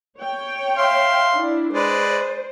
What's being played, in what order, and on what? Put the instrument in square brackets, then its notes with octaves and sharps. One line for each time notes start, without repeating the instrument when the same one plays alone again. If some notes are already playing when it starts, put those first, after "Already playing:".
[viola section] C#5 G5
[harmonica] E5 F5 C6
[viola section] D4 E4
[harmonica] G#3 B4 D5 [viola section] C5